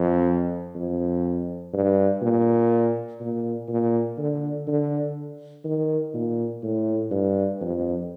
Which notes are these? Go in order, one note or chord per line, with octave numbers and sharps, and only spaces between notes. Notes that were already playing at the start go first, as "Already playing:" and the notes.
Already playing: F2
F2
G2
A#2
A#2
A#2
D3
D3
D#3
A#2
A2
G2
F2